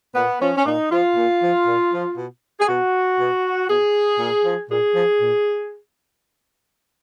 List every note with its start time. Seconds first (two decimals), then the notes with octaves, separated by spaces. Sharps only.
0.15 A#2 B3
0.40 F3 C#4
0.57 C#4
0.65 A#2 D#4
0.91 F3 F4
1.16 A#2
1.41 F3
1.66 A#2
1.92 F3
2.17 B2
2.60 G#4
2.68 B2 F#4
3.19 B2
3.69 B2 G#4
4.19 A#2
4.45 F3
4.69 A#2 G#4
4.94 F3
5.21 A#2